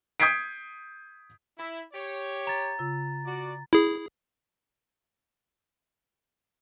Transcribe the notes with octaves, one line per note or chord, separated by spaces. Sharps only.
D#6 G6 G#6 B6 C7 D7
E4
G4 C#5
A#5 A6
C#3 F4 E6
F#4 D5
E4 G#4